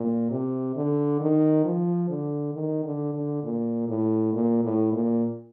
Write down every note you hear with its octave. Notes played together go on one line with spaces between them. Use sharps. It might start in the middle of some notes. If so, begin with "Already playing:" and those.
Already playing: A#2
C3
D3
D#3
F3
D3
D#3
D3
D3
A#2
A2
A#2
A2
A#2